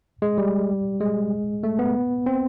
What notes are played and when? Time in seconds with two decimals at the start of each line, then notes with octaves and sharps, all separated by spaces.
0.22 G#3
0.38 G3
1.01 G#3
1.63 A3
1.79 B3
2.26 C4